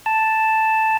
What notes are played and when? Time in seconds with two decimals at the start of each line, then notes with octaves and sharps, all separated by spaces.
0.06 A5